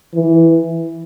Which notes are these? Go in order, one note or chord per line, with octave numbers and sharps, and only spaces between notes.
E3